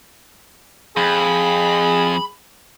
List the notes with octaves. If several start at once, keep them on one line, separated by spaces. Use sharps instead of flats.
F2 G#4 B5